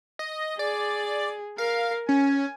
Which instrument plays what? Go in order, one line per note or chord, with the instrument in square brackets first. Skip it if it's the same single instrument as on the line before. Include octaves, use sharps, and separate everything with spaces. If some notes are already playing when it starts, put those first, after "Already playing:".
[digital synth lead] D#5
[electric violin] G#4 [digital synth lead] D5
[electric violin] A#4 [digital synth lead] F5
[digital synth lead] C#4 [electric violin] G#5